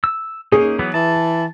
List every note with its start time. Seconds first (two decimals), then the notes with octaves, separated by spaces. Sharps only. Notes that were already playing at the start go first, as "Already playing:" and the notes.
0.04 E6
0.52 A#3 C#4 D#4 G#4
0.79 E3 F#3 B3
0.94 E3 A5